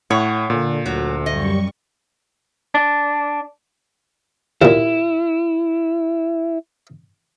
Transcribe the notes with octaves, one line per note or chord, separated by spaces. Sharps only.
A2 C#5 F#5
A#2 D3
D2 F#3
F#2 G3 D#5 C#6
D4
D#2 A#2 E4